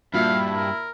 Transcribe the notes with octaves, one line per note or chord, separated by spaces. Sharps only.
G2 A#2 E4 F#4 E5 F5
A#4